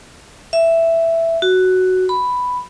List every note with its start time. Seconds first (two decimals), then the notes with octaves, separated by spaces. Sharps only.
0.53 E5
1.42 F#4
2.09 B5